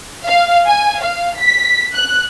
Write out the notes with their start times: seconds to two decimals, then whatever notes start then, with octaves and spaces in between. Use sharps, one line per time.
0.25 F5
0.66 G#5
1.00 F5
1.38 B6
1.93 F#6